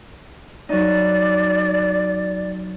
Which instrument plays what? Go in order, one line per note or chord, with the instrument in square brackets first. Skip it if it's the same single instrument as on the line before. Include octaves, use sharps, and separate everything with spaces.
[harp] F#3 D#4 [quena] D5